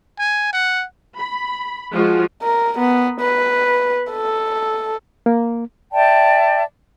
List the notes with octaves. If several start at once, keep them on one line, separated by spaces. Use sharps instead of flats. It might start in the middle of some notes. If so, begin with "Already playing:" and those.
G#5
F#5
B5
F3 G#3 F4 F#4
A#4
B3
B4
A4
A#3
D5 E5 G5 A5